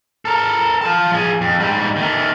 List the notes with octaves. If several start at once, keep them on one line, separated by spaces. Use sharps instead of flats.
A4 A#4
F4 A5
F3 G#4
F2
G#2 G3
D#3 A3